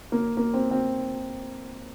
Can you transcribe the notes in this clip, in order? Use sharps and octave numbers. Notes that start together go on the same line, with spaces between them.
A#3
A#3
C4
C4